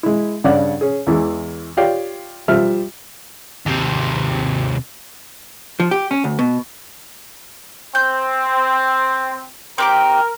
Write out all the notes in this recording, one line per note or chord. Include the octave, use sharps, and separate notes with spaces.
G#3 E4
G2 C#3 D4 C#5 D5 F#5
C#4 G#4
E2 E3 G#3
F4 G4 C#5 D5 F5 G5
F3 G3 F4 E5 F6
D#2 C3
F3
G4
C#4
D2
B2
C4 G6
C4 G4 A#4 D6